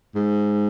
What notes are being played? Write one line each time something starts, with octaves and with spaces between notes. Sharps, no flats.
G#2